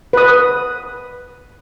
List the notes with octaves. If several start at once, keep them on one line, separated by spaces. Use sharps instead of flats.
B4 D#6